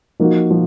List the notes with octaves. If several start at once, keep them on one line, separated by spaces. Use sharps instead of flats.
F3 A#3 D#4 F#4
F3